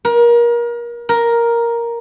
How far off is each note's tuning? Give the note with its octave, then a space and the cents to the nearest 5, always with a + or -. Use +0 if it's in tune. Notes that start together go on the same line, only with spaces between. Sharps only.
A#4 +30
A#4 +5